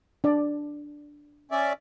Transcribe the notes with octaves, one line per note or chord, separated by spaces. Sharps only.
D4 D5
C#4 D5 E5